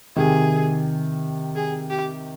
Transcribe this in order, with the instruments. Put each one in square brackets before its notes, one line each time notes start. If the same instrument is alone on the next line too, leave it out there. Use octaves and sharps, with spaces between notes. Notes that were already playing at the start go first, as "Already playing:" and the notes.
[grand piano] C3 D#3 [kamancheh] G#4
[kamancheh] G#4
G4